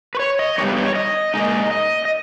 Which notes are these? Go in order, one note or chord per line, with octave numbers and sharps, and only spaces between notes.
B4
C#5
D#5
G2 G3 B3 D#4 C#5
B4
C#5
D#5
A#2 G#3 D#4 D#5
D#5
D#5